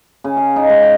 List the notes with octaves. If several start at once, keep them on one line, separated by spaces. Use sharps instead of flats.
C#3
F5
D#4
G#2
G5